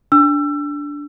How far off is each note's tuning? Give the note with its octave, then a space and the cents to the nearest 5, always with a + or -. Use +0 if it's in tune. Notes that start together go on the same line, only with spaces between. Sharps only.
D4 -10 E6 +30